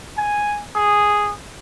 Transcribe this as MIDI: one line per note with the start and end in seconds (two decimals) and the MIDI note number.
0.18 0.61 80
0.75 1.32 68